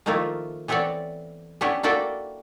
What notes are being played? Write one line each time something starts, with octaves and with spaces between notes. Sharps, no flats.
D#3 F3 A3 A#3 E4 F4
E3 B3 C4 A4 C#5 D5
B3 C#4 D4 E4 G4 C#5
A#3 E4 F#4 A4 D5 G5